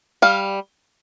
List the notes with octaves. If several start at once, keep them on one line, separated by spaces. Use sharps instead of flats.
G3 F5